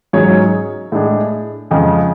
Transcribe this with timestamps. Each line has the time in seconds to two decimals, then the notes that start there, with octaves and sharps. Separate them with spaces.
0.13 G#2 F#3 C#4 G#4 C#5
0.92 A2 G#3 D4 G#4
1.71 F2 C#3 G#3 C#4